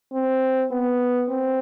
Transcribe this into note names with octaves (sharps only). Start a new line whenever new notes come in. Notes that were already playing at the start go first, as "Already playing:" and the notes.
C4
B3
C4